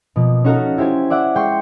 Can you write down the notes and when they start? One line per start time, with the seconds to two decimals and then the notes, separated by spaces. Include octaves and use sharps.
0.16 B2 F3 A#3
0.44 C#4 D#4 F#4 A4 F5 A#5
0.78 E4 G4 C5 G#5
1.10 D5 E5 F#5 D6 E6
1.35 G#3 G5 C6 C#6 C7